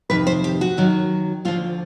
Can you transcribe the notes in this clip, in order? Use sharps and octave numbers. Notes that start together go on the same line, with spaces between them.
F2 C3 D#3 B4
C5
G4
F#4
F#2 D#3 F#3
D2 D3 F3 F4